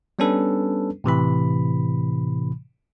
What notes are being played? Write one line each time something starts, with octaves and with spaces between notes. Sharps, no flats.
G3 B3 C#4 D4 A4 B4
A2 C3 E3 B5